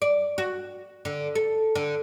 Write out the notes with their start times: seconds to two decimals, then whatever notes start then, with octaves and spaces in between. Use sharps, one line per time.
0.02 D5
0.38 F#4
1.05 D3
1.35 A4
1.75 D3